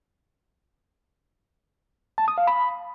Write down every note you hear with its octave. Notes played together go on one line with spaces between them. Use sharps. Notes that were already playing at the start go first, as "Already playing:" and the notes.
A5
D#6
F5
B5